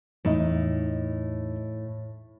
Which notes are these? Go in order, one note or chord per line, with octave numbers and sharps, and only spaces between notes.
E2 A2 D#4 D#5